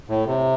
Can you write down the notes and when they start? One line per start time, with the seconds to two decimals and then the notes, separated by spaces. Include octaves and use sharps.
0.08 A2
0.26 C3